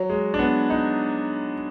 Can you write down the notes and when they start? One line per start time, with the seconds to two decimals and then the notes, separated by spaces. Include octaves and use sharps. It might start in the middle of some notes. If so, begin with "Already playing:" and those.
Already playing: F#3
0.09 G#3
0.34 D4
0.39 B3
0.70 D#4